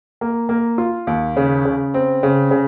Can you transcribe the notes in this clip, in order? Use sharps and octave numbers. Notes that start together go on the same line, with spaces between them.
A#3
A#3
F4
D#2
C#3
C#3
C4
C#3
C#3